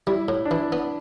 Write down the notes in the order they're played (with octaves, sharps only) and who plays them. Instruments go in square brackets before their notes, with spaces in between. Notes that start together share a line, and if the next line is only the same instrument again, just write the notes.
[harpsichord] G3 [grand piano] E4
[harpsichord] A2
[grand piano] D4
[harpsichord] E3 [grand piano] E4
[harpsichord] B3